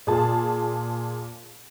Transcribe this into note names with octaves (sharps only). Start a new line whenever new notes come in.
A#2 G#4 A5